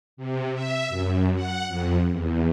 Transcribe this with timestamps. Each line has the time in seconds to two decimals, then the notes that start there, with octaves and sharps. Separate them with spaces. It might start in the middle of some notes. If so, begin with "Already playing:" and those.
0.17 C3
0.54 E5
0.89 F#2
1.35 F#5
1.68 F2
2.10 E2